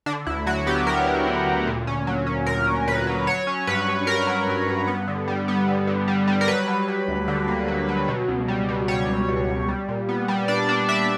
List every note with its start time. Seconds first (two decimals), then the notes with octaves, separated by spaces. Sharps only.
0.06 D3 D4
0.27 D2 E4
0.46 F#3 F#4
0.67 B3 G4
0.87 F#3 A#4
1.07 F#3
1.27 D3
1.47 D2
1.67 A#2
1.87 C#4
2.07 F#3
2.26 C#4
2.46 A#2 A#4
2.67 C#4
2.87 A#2 B4
3.07 F#3
3.27 F#3 C#5
3.47 C#4
3.67 G2 B4
3.88 G2
4.07 G2 A#4
4.27 F#3
4.47 G2
4.67 G2
4.87 B3
5.08 D3
5.28 G3
5.48 B3
5.68 D3
5.87 D3
6.08 G3
6.28 G3
6.41 A#4
6.48 F#3 B4
6.68 F#3
6.88 F#3
7.08 D2
7.28 D3
7.48 A#3
7.68 F#3
7.88 F#3
8.08 B2
8.28 C#2
8.48 G3
8.69 B2
8.88 G3 C#5
9.08 C#2
9.28 B2
9.48 C#2
9.68 G3
9.88 A#2
10.09 B3
10.28 G3
10.48 D4 D5
10.69 D4
10.88 D4 E5